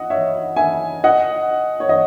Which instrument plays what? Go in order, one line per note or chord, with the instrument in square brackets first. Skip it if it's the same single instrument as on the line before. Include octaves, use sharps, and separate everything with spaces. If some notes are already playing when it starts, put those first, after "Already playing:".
Already playing: [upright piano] D#5 F#5
C#5 E5
E5 G#5
D#5 F#5
C#5
D#5